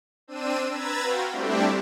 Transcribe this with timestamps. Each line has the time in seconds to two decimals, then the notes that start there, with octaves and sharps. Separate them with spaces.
0.28 C4 D4 E6 D#7
0.71 B4 A#5 B5 E6 G#6 A6
1.02 F#4 F5 G5 C6 A#6
1.31 G3 A3 C4 D4 E4 G4